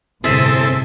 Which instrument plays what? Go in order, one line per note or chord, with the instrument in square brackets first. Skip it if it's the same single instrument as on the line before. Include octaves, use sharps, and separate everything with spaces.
[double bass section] G1 A2 C3 [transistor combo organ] C4 E4 A4 [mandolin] G#4 E5